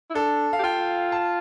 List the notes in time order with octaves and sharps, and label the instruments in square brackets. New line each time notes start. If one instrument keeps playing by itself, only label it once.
[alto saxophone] E4
[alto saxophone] D4 [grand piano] A4
[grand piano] F5
[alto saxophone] G4
[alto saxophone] F4 [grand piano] G5
[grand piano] A5